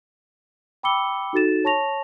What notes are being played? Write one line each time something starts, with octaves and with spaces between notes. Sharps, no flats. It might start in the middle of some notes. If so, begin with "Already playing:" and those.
G5 B5 D6 E6 C#7 G7
D#4 F#4 A4 A6 E7
C#5 A5 C#6 A#6 F7